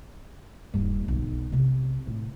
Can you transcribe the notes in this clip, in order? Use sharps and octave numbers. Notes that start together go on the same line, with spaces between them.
D#1 G2
B1 D3
C3 C4
A2